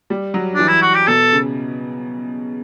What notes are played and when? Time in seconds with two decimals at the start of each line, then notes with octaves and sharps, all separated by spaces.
0.10 G3
0.34 F#3
0.54 E3 D4
0.68 E4
0.82 F#4
0.94 G4
1.08 B2 A4
1.33 C#3